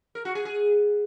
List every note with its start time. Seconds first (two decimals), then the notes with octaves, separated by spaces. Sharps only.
0.15 A#4
0.25 F#4
0.35 G#4
0.45 G#4